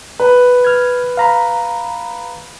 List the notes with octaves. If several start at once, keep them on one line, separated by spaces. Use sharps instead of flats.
B4
F6 G#6
F5 A#5 B5